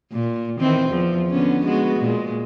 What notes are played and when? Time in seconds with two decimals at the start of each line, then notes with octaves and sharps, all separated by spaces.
0.13 A#2
0.60 D#3 E3 C4
0.89 E2 F3
1.30 D3 B3 C#4
1.65 G#3 B3 F#4
2.00 A#2 G#3